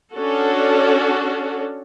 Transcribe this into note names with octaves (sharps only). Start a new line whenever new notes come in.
C#4 D4 F#4 A4